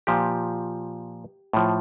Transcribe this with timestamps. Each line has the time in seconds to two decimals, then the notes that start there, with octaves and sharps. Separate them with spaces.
0.07 A#2 F3 G4
1.53 A2 F3